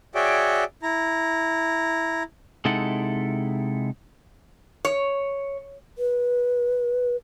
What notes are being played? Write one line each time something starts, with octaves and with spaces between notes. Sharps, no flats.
F#4 G#4 C#5 D5 E5 G5
E4 A#5
C3 G#3 D#4 E4 A4 F#5
C#5
B4